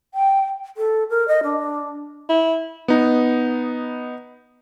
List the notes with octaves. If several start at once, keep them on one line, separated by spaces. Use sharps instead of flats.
G5
A4
A#4
D#5
D4
E4
B3 D#4